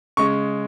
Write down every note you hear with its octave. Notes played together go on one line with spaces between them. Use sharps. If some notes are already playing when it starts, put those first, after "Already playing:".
C#3 G#3 C#6